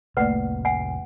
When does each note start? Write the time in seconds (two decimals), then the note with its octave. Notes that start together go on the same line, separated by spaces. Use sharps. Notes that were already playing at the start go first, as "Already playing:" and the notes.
0.17 F1 C2 A3 A#3 B4 D5 F#5
0.65 F#5 G#5